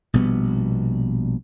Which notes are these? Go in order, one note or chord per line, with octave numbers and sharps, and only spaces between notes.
A#1 B2 G3 B3